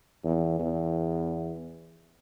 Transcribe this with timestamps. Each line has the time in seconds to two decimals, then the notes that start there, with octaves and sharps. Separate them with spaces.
0.25 E2
0.59 E2